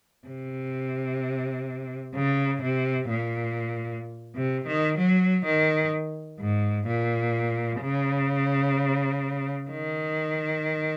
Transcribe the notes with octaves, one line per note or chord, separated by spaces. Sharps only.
C3
C#3
C3
A#2
C3
D#3
F#3
D#3
G#2
A#2
C#3
D#3